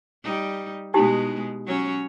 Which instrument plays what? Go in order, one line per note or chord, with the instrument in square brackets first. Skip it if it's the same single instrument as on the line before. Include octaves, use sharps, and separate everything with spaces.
[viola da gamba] G3 D#4
[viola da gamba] B2 G#3 B3 [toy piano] D#4 E4 G4
[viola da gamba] F#3 C#4 C#5